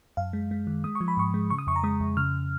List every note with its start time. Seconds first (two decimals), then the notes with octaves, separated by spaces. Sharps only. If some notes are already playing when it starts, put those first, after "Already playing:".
0.17 F#2 F5
0.33 G#3
0.51 G#3
0.67 D#3
0.84 G#3 D#6
0.95 C#6
1.01 F3
1.08 B5
1.17 G#2 C#6
1.34 G#3
1.50 C#3 C#6
1.58 D#6
1.67 F2 C#6
1.76 A#5
1.84 G#3 D#6
2.00 F2
2.17 C#3 F6